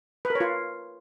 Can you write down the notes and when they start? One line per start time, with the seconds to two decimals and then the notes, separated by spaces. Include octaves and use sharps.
0.25 B4
0.30 A#4
0.35 C#5
0.40 F4